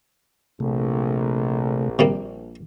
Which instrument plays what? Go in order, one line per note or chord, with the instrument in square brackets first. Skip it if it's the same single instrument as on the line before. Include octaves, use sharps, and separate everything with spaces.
[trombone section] A#1 [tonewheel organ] C3 A3
[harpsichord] C3 G3 A#3